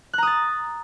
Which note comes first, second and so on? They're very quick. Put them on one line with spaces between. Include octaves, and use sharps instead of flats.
F#6 A#5 D#6 A6